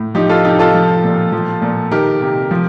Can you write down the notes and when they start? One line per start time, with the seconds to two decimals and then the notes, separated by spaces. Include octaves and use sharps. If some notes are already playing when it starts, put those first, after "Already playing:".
Already playing: A2
0.15 F3 D#4 G4
0.29 F4 A4
0.44 C3 D#4 G4
0.59 F4 A4
0.74 F3
1.04 A#2
1.32 F3
1.62 A#2
1.92 D#3 G4 A#4
2.21 C3
2.51 F3